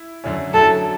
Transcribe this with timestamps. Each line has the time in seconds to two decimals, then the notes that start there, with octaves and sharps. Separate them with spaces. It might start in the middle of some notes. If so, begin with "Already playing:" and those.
Already playing: E4
0.24 F#2 D3 F#3 C#4 E4
0.54 F#2 D3 F#3 C#4 E4 A4